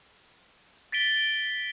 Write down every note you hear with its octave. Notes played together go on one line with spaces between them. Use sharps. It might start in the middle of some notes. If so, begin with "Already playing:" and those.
A6 B6 D7 G7